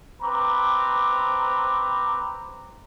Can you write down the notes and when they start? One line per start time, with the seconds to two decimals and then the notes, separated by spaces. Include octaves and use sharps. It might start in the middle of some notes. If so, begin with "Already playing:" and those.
0.22 C4 B4 A#5 D6